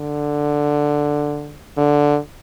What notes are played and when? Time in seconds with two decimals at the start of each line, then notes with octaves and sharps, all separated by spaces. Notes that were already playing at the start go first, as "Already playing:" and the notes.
Already playing: D3
1.77 D3